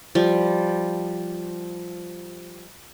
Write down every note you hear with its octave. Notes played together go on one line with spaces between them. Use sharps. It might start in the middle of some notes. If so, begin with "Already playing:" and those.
F3 G3